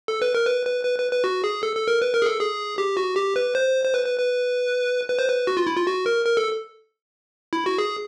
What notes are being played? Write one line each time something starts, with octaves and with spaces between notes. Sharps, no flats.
A4
B4
A#4
B4
B4
B4
B4
B4
F#4
G#4
A4
A4
A#4
B4
A#4
G#4
A4
G#4
G4
F#4
G4
B4
C5
C5
B4
B4
B4
B4
C5
B4
F#4
F4
E4
F4
F#4
A#4
A#4
A4
E4
F#4
G#4